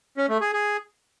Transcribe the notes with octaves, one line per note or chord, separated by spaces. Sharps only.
C#4
A3
G#4
G#4